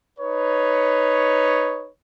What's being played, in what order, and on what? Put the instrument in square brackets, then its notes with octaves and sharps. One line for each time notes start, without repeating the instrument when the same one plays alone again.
[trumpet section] D#4 B4 C#5